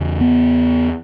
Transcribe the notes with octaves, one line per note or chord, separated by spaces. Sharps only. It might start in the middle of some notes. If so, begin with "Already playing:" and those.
Already playing: E2 C#3
B3